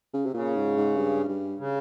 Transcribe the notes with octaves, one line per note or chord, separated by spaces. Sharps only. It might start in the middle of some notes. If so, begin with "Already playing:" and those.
C#3
C3
A#2 C#3
G#2
G#2
G2
G2
C#3